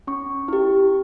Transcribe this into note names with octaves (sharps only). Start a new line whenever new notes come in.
C#4 C#6
E4 G4